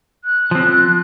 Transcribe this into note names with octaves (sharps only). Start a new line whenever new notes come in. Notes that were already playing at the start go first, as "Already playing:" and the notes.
F#6
F3 C4